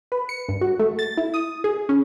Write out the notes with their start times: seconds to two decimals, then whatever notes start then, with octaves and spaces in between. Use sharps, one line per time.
0.12 B4
0.29 C#7
0.49 G2
0.61 F#4
0.79 A3
0.99 A6
1.17 E4
1.34 D#6
1.64 G#4
1.89 C#4